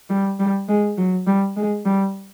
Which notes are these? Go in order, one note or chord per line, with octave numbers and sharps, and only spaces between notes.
G3
G3
G#3
F#3
G3
G#3
G3